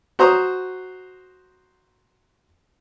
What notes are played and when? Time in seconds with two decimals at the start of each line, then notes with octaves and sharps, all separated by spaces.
0.19 F#4 C5 A#5 D#6